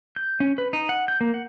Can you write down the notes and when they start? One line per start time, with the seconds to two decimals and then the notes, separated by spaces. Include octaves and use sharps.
0.16 G6
0.40 C#4
0.58 B4
0.73 D#4
0.89 F#5
1.08 G6
1.21 A#3
1.34 F#5